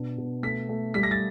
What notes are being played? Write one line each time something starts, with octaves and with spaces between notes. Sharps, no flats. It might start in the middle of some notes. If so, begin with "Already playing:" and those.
Already playing: B2 D4
B2
A3 B6
A3
G3 B6
A#6
A6